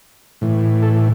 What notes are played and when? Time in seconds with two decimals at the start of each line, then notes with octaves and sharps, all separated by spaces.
0.41 A2 E3
0.83 A4